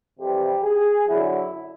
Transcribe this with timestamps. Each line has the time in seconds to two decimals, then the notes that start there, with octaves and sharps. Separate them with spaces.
0.19 F2 C3 E3 G3 G4
0.63 G#4
1.08 F#2 D3 F#3 E4